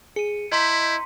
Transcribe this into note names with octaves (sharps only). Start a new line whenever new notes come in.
G#4 C#7 D#7
E4 D#5 A#5 C6 G6 B6